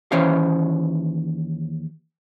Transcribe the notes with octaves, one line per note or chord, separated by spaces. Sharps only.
D#2 E3 C#4 C5 C#5 F5